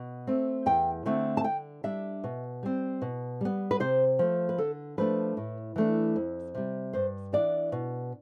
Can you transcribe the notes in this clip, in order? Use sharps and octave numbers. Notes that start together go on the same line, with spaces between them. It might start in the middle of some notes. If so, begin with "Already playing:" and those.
Already playing: B2
A3 C4
E2 G5
D3 A3 C4
A5
D3 G5
G3 D4 E5
B2
G3 C4
B2
G3 B3
B4
C3 C5
F3 A3
B4
D3 A4
F3 A3 D4 B4
A2
E3 A3 D4
F2
C3 G3
G2 C5
E3 B3 D4 D5
B2